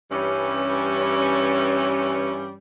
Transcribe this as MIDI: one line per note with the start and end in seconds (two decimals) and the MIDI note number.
0.12 2.55 43
0.12 2.55 52
0.12 2.55 55
0.12 2.55 61